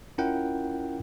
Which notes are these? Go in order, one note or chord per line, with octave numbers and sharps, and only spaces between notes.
C#4 E4 F4 A#4 F#5 G5